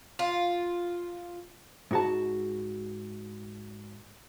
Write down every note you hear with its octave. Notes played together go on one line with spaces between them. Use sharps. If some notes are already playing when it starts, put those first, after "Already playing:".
F4
G#2 F#4 A5